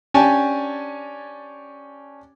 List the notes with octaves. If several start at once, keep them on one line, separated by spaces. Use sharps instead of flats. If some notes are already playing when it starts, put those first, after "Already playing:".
C#4 D4 G4 G#5 A5